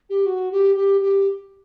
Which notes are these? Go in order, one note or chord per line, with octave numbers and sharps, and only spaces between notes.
G4
F#4
G4
G4
G4